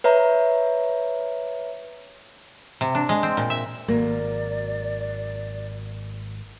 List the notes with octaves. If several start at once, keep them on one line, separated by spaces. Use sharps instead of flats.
B4 C#5 E5 A#5
C3
D4
G#3
C4
A#2
E5
G#1 C#2 F#3 A#3 D5